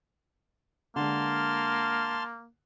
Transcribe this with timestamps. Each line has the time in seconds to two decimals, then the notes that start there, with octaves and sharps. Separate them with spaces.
0.96 D3 G#3 A#3 A5 C6 F6